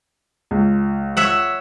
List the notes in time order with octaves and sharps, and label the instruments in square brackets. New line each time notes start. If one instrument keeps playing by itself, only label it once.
[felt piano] C#2
[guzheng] C#5 E5 F#5